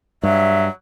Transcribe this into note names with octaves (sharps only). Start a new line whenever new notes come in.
G2 F#3 E5